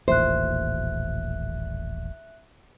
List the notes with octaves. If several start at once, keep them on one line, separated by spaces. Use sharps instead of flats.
D#1 A1 A#2 C5 E5 F#6